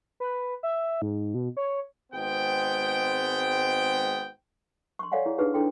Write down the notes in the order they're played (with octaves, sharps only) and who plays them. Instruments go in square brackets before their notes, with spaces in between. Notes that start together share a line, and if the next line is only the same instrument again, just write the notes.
[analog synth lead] B4
E5
G#2
B2
C#5
[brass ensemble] G#1 G#3 B3 C4 C5 G5
[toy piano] C6 C#6
A4 C#5 D5 F5 F#5 G#5
E4 G#4 C#5
D4 D#4 G4 G#4 B4
D4 E4 A4 G5 C6